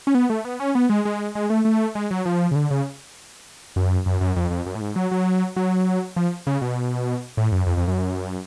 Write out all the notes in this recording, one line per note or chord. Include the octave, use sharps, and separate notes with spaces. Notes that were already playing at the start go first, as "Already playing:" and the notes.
C#4
B3
A3
B3
C#4
B3
G#3
G#3
G#3
A3
A3
G#3
F#3
F3
C#3
D3
C#3
F#2
F#2
F#2
F2
F2
F#2
A2
G#2
F#3
F#3
F#3
F3
C#3
B2
A2
F#2
F2
F2
F#2